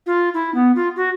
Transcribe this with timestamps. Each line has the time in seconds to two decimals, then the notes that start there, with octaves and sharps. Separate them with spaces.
0.06 F4
0.34 E4
0.54 B3
0.75 F4
0.96 F#4